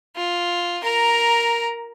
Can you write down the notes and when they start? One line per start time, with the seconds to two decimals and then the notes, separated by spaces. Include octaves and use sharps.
0.16 F4
0.84 A#4 A#5